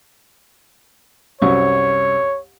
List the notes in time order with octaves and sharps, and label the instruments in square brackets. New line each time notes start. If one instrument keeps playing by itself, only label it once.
[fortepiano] C2 F#2 C#6 [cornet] C#5